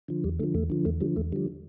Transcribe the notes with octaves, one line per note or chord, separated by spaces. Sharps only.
D3 F3
E2 G3
D3 F3 A3
E2 A3
D3 F3
E2 A3
D3 F3 G3
E2 A3
D3 F3 G3